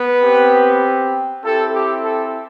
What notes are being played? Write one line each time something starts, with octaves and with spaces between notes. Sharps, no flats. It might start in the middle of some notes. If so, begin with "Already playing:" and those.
Already playing: B3 B4
C4 G4
C4 E4 G4 A4
G4
A4